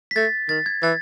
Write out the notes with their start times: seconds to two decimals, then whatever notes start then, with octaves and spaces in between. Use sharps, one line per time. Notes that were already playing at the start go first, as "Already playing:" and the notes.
0.11 B6
0.16 A3 A6
0.49 D#3 A6
0.66 G#6
0.83 E3 A6